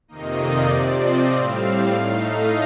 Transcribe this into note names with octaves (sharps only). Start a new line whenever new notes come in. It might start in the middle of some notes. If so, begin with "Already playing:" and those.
F2 C3 D#3 A#3 D#4 D#5
D5
C3 F3 C4 D5
D#5
A2 G3 C4 F5
A2 A3 D#4 F5
D#5